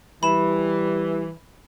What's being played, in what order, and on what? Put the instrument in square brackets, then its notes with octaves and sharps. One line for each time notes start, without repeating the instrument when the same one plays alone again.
[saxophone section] E3 [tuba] G3 [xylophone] B5 E7